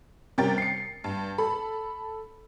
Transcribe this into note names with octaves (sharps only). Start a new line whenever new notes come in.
C3 G3 C#4 A#4 G5 A6
C7 C#7
G2
A4 B5